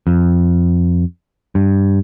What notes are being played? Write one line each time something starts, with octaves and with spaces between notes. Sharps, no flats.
F2
G2